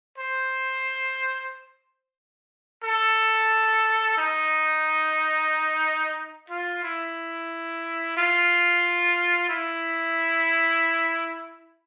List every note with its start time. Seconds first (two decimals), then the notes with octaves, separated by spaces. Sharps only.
0.18 C5
2.84 A4
4.18 D#4
6.50 F4
6.83 E4
8.17 F4
9.49 E4